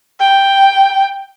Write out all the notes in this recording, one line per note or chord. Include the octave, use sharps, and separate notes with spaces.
G5